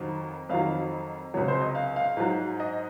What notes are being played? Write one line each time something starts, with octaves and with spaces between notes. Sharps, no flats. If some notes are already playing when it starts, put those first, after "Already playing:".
Already playing: F2 D#3 F#3
F2 D#3 F#3 F5
C#2 C3 F#3 C#5
C5
D#5
F5
F5
G#2 F#3
D#5